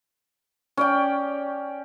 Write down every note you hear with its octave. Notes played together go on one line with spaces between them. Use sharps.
C#4 D5 G5